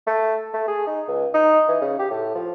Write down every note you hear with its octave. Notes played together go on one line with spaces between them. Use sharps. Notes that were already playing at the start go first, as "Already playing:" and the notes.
A3
A3
G#4
D#4
C#2
D#4
E3
C#3
G4
A2
F3